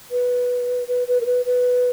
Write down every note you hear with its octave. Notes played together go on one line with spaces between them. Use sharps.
B4
B4
B4
A#4
B4
B4